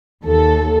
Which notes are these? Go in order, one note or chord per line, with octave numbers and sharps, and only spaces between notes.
D#2 A4